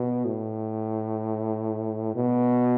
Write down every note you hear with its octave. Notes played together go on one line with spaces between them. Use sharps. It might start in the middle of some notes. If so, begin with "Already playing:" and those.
Already playing: B2
A2
B2